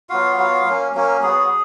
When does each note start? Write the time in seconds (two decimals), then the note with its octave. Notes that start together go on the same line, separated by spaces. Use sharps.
0.09 F#3 B3 F4 F#4 F5
0.38 F#3 B3 F#4
0.66 F#3 A#3 C#4
0.95 F#3 A#3 C#4
1.23 F#3 B3 F#4 G#4